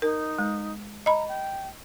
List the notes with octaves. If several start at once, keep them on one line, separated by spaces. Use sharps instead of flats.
D#4 A#4
G#3
D#5 A#5 B5
G5